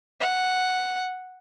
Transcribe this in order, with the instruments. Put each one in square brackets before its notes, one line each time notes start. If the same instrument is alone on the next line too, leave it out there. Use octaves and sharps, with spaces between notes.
[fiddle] F#5